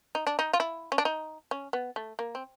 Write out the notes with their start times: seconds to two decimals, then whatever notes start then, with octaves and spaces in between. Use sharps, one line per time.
0.15 D#4
0.27 D4
0.39 D#4
0.53 F4
0.60 E4
0.92 C#4
0.98 D4
1.05 D#4
1.51 C#4
1.73 B3
1.96 A3
2.19 A#3
2.35 C4